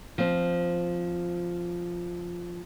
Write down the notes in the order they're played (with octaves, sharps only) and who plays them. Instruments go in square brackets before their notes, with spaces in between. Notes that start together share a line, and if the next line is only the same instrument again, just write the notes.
[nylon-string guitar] F3 C4